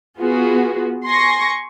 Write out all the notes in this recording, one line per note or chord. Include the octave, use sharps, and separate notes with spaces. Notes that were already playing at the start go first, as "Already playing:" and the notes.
B3 F4 F#4 G#4
G#5 C6 C#6 A#6